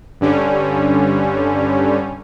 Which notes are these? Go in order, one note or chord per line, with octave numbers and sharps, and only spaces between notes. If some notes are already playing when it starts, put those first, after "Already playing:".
G2 D3 G3 C#4